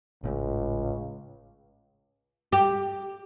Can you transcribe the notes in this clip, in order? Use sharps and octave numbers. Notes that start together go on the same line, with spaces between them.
G#1 C#2 A2 C#3
G4